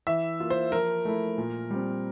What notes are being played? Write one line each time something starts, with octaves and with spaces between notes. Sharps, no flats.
E3 E5
A#3 F4
C5
F3 A#4
A3 E4
A#2
G3 C4